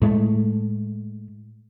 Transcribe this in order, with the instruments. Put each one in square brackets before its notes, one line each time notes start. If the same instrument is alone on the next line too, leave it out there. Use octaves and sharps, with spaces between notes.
[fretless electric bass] A2 G#3 A3